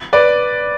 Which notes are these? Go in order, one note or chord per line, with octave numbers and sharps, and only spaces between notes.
B4 D5